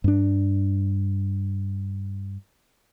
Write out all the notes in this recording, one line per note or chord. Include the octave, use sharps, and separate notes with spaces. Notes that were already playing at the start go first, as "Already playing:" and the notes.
G2 D4